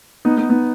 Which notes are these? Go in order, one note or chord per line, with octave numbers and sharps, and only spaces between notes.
B3 D#4
B3 D#4
B3 D#4